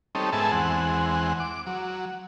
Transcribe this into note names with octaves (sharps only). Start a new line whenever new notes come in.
G3 C4 C#4 D#4 A4
G#2 B3 G#4 A4 E5 A5
E2 G#3 C4 F#5
D6
F#3